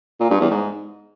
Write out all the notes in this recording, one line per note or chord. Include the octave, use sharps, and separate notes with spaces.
A#2
G2
E2
G#2